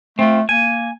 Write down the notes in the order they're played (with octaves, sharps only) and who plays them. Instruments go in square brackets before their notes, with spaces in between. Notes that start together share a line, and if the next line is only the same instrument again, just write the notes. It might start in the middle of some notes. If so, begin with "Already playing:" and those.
[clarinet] A3 [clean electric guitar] C4 F4
[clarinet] A#3 [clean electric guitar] G#5